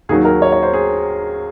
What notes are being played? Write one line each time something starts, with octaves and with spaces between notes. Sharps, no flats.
D#2 D#3 F#3 G#4
A#4
C#5
C#5
C5
G#4